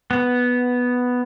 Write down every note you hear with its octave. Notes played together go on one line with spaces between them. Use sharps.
B3